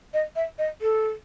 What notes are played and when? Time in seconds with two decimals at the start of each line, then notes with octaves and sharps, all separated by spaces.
0.14 D#5
0.36 E5
0.59 D#5
0.81 A4